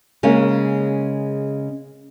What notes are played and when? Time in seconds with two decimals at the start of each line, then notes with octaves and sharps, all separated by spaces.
0.23 C#3 G#3 A#3 C#4